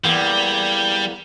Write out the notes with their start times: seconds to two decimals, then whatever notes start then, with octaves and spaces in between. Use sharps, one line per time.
0.04 E2 G3 A#3